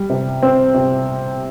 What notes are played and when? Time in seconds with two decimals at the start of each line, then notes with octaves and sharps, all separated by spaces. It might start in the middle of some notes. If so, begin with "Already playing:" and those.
Already playing: G3
0.10 C3
0.43 C4
0.74 C3